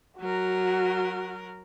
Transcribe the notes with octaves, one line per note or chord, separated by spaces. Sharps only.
F#3 F#4 A#4